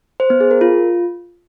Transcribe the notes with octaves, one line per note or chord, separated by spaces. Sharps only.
C5
B3
G#4
A#4
F4